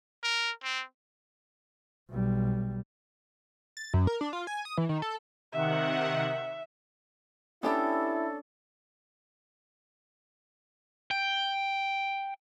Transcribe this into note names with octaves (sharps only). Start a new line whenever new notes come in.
A#4
C4
B1 G3
A6
F#2
A#4
D4
F4
G#5
D#6
E3
D#3
A4
C3 D#3 E5 F#5
B3 C#4 D4 E4 G4 A4 E5
G5